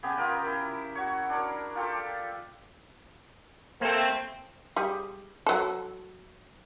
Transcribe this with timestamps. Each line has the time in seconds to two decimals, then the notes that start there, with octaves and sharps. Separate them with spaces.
0.03 C#3 B3 G4 G#4
0.17 F4 A#4 D#5
0.46 E4
0.95 F#4 C#5
1.29 D4 A#4
1.76 F4 G4 A4
3.81 A3 A#3 C4 A4
4.76 G3 G#4
5.46 F#3 A4